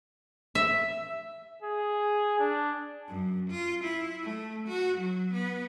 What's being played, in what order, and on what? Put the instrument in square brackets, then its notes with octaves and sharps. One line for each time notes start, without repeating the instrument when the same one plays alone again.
[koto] E5
[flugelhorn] G#4
D4
[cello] F#2
F4
E4
A3
F#4
F#3
B3